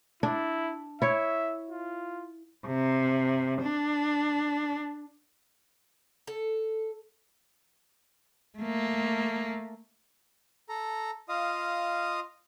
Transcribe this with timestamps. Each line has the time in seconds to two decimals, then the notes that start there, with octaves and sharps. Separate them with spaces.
0.23 D4 E4
1.02 E4 C#5 E5
1.70 F4
2.66 C3
3.61 D4
6.27 A4
8.59 A3 A#3
10.69 A4 A#5
11.29 F4 D#5 F5 D#6